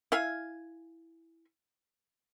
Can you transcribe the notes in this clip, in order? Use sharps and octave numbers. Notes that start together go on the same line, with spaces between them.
E4 F5 G#5